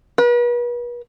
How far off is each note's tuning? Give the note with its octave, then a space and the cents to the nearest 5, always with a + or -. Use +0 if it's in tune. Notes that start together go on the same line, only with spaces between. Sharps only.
B4 -40